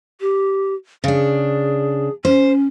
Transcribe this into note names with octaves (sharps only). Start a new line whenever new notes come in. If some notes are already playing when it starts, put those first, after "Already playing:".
G4
C#3 D4 G#4
C#4 C5